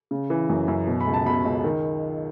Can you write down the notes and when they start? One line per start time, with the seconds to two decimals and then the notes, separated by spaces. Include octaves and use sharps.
0.11 C#3
0.30 E3
0.49 F#2
0.68 F#2
0.87 B2
1.00 B5
1.07 C#2
1.13 A5
1.26 B2 B5
1.45 C#2
1.64 D#3